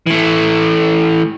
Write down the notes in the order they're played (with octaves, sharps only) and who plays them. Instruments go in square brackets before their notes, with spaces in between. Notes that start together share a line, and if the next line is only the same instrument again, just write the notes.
[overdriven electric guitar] E3 A3